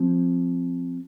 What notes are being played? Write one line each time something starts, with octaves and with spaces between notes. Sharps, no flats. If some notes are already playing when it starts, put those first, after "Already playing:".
Already playing: F3 C4